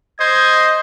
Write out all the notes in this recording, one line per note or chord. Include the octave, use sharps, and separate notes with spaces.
C5 D#5 G#6